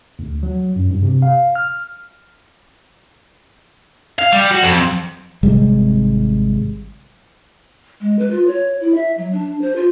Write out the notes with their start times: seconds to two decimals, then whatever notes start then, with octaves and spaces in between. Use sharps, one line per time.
0.19 D2
0.43 F#3
0.76 F#2
0.91 G2
1.03 C3
1.22 F5
1.55 F6
4.19 F5
4.32 G3
4.51 F#4
4.63 F2
5.43 G#1 C3 G3 G#3
8.01 G#3
8.19 B4
8.31 F4
8.48 C#5
8.81 E4
8.95 E5
9.18 F#3
9.33 D4
9.61 C5
9.76 F4